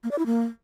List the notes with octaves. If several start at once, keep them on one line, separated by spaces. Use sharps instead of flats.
A#3
D5
E4
A#3